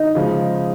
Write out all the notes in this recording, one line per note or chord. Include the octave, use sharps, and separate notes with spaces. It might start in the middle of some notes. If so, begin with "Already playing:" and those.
Already playing: D#4
C#3 F3 G#3